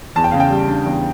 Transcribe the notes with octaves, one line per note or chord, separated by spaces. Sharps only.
E2 A5
G5
C#3 F5
G5
G3
D4
E2